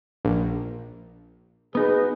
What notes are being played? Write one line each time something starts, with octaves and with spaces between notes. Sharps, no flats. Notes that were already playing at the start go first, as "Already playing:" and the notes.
A#1
B3 D#4 F#4 G#4 B4